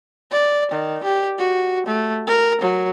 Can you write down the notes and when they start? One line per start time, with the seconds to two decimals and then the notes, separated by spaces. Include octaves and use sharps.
0.31 D5
0.71 D#3
1.04 G4
1.39 F#4
1.86 A3
2.27 A#4
2.61 F#3